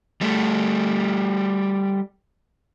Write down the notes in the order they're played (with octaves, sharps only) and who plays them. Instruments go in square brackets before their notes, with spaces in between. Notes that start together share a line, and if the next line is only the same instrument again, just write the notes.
[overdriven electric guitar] G3 A3